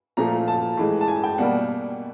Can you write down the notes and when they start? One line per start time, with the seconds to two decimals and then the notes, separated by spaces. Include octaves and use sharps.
0.17 A#2 F3 A3 A#5
0.48 A5
0.77 A2 E3 G#3
1.01 A5
1.08 G#5
1.23 G5
1.38 B2 G3 A#3 F#5